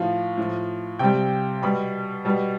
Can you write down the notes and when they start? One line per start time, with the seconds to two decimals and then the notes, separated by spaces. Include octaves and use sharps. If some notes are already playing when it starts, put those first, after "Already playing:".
Already playing: A2 F3 F5
0.37 A2 F3
0.99 C3 G3 G5
1.62 B2 G3 B5
2.25 B2 G3